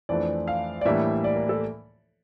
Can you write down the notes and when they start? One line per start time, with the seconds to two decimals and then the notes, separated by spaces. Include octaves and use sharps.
0.09 F2 E3 A3 D4 D5
0.48 F5
0.81 D5
0.85 A2 E3 G3 A#3 D4 E5
1.24 D5
1.36 A#4
1.49 A4